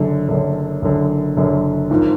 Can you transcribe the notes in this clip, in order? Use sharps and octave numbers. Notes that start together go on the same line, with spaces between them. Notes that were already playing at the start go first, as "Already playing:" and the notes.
Already playing: F#1 F#2 D3
F#1 F#2 D3
F#1 F#2 D3
F#1 F#2 D3
G#1 G#2 F3